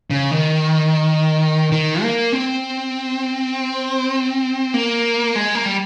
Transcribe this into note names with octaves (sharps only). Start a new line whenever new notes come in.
C#3
D#3
D#3
A#3
C4
A#3
G#3
A#3
G3